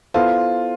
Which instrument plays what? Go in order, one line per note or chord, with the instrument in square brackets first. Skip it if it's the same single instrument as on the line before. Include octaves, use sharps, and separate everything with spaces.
[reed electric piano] B3 E4 A4 C5 [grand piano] F4